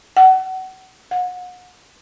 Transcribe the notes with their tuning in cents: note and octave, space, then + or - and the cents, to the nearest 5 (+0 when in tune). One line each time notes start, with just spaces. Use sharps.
F#5 +30
F#5 -35